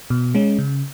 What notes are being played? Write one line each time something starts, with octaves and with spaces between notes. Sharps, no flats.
B2
G#3 C#4
C#3